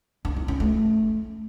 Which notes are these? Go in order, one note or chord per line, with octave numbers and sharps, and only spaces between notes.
D4
D#4
C#4
A3